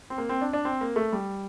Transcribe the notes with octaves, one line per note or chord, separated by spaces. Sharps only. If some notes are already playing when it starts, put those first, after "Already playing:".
C4
A#3
C4
D4
D4
C4
A#3
A3
G3